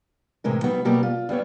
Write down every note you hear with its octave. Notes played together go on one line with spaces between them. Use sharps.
A2 C3 E3 G#3 A#4
F#3 G3 B3 D#4
B2 F#3 G3 A#3 G4 A#4
F4
G2 G3 B3 C#5